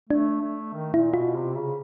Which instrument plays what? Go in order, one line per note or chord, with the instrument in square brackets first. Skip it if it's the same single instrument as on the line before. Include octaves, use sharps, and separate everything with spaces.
[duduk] A3 [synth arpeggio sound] D4
[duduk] A3
D#3
[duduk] A#2 [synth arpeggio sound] E4
[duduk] B2 [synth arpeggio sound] F4
[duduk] C3
C#3